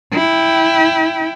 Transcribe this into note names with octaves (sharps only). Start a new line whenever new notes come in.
E4 G5